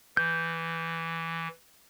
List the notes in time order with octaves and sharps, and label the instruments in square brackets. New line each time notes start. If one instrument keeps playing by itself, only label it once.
[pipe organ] E3 [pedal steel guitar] G6